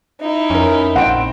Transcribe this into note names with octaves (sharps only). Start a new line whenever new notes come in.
D#4 E4
F2 C#4 A#4
A#1 C4 F#5 D7